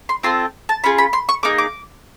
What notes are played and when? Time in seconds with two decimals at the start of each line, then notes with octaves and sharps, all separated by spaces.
0.09 C6
0.23 C4 F4 A4 C6
0.69 A5
0.84 C#4 F4 G#4 B5
0.98 B5
1.13 C6
1.29 C#6
1.43 A#3 D#4 G#4 D6
1.58 D6